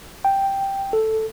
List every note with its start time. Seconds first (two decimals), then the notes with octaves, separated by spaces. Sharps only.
0.25 G5
0.93 A4